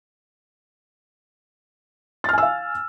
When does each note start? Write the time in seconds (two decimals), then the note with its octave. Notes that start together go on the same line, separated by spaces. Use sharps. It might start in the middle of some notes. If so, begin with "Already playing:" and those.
2.24 A6
2.29 F6
2.33 G#5
2.38 E6
2.42 F5